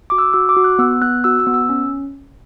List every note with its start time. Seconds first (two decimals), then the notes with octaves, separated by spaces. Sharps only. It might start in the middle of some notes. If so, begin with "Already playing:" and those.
0.10 F#4 D6
0.18 E6
0.33 F#4 E6
0.49 D6
0.56 F#4
0.64 F#6
0.79 B3 E6
1.02 B3 F#6
1.24 F#4 E6
1.40 E6
1.47 B3
1.54 E6
1.69 C#4